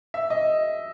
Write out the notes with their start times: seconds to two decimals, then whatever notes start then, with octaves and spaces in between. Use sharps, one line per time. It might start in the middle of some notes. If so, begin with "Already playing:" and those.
0.14 E5
0.30 D#5